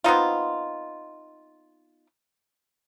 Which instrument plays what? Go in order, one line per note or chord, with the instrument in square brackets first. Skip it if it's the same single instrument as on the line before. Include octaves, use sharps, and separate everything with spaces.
[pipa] B3 C4 D#4 F4